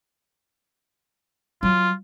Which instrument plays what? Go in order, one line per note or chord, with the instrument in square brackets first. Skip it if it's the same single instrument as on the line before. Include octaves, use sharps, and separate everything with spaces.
[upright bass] F#3 [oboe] F4